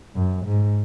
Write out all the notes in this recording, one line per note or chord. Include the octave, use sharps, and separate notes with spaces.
F#2
G#2